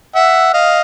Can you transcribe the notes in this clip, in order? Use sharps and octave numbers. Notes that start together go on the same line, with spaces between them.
E5 F#5
D#5 F5